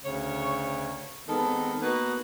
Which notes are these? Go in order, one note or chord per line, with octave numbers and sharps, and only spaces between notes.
D2 C#3 C#5
D#3 G#3 B3 C4 A4
A#3 B3 D#4 F#4 B4